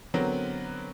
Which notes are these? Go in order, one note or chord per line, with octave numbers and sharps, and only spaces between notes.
D3 F#3 B3 C4 A#4